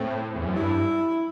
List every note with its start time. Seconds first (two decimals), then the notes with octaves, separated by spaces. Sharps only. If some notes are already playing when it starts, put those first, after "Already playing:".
Already playing: A2 C4
0.35 E2
0.45 F#2
0.56 G2 E4